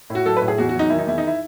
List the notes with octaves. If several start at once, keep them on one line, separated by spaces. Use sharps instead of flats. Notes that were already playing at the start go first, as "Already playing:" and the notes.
A2
F#4
F#3 A4
A2 B4
G#4
E2 F#4
F#4
F#3 D#4
D#3 E4
D#4
E2 E4
D#4
E4